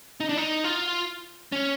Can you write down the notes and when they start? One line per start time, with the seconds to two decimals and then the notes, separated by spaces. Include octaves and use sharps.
0.20 D#4
0.29 D4
0.37 D#4
0.64 F4
1.52 C#4